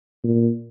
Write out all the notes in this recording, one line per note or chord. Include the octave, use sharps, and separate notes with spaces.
A#2